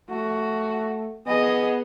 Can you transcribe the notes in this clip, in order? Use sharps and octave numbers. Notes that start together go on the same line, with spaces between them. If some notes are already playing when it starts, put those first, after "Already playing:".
A3 F#4
B3 G#4 D#5